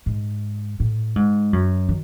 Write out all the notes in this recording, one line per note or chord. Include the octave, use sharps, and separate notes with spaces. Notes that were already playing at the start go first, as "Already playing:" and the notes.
G#2
A2
G#2
F#2
D#3